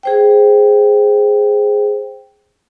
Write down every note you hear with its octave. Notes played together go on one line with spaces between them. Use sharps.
G#4 C5 G5